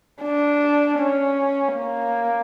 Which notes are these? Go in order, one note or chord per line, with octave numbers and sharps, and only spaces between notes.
D4
C#4
A#3